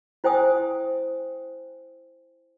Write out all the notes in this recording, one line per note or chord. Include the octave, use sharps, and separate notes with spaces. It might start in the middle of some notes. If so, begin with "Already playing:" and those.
E4 C5 G5 G#5 D#6